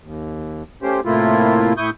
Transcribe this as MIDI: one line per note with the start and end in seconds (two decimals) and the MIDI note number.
0.03 0.63 39
0.82 1.00 57
0.82 1.00 61
0.82 1.00 67
0.82 1.00 72
1.05 1.73 45
1.05 1.73 48
1.05 1.73 57
1.05 1.73 58
1.05 1.73 64
1.05 1.73 65
1.77 1.90 45
1.77 1.90 64
1.77 1.90 85
1.77 1.90 87
1.77 1.90 91